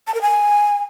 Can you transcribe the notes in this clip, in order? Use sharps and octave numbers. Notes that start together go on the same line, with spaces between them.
A5
A#4
G#5